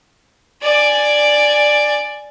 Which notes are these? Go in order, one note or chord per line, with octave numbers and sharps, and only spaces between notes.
D5 G#5